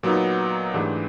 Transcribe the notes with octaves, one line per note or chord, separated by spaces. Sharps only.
A#2 F#3 B3 D#4
G#2 E3 A3 D4 G4